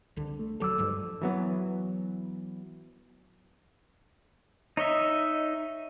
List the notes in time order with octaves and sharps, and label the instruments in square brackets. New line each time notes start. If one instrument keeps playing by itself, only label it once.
[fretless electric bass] C2 D3
[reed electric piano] A3
[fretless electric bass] D#1 F#3 [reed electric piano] A4 D6 E6
[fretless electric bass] G2 F3 G3
[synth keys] E3 F#3 B3
[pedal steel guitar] D#4 C#5 D#5 E5